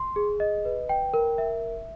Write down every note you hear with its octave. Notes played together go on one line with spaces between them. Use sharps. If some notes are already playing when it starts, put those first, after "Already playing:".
Already playing: C6
G#4
D#5
B4
G5
A#4
E5